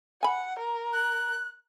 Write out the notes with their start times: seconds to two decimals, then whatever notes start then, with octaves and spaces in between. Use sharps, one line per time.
0.23 F#5 G#5 B5
0.59 A#4
0.93 F#6